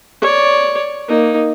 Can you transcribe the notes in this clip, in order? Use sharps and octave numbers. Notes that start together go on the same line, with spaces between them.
C#5 D5
A#3 D#4